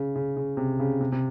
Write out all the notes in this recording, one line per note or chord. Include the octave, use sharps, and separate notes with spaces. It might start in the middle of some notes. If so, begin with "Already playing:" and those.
Already playing: C#3
C#3
C#3
C3
C#3
C3
C3